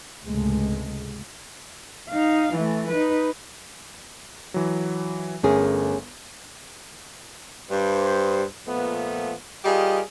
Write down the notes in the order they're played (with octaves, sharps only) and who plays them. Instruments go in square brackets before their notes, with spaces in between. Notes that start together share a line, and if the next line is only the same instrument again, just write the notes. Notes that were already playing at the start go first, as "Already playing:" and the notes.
[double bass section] C#2 G#2 C3 G#3 A3
[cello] D#4 F5
E3 A3
D#4 B4
[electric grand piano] E3 F#3
[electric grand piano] G1 A#4 [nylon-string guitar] A3 C#4 G#4
[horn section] G2 C5
A#2 F3 A3 B3
G3 F4 G4 G#4 A#4 D#5